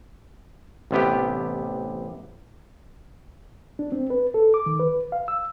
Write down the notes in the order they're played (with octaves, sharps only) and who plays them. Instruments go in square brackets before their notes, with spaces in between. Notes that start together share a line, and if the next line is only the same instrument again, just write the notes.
[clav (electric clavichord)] A1 C3 B3 G4
[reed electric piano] D4
C4
B4
A4
D6
D#3
B4
F5
E6